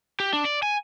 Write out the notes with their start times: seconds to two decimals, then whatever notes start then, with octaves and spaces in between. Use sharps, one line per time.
0.20 G4
0.33 D4
0.45 D5
0.63 G#5